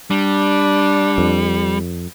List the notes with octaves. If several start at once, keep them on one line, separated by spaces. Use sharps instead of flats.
G3 D4
F2